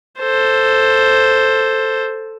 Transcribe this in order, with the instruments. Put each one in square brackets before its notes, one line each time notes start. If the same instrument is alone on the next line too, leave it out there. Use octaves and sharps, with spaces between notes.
[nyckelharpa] A4 C5